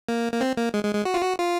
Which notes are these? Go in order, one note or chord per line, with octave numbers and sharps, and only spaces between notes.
A#3
A#3
C4
A#3
G#3
G#3
G#3
F#4
F4
F#4
F4